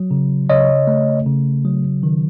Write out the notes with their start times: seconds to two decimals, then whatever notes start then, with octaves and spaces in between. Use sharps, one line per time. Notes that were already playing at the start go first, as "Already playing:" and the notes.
Already playing: F#3
0.11 C#3
0.49 C#3 C#5 D#5
0.87 A3
1.26 C#3
1.65 F#3
2.03 D#3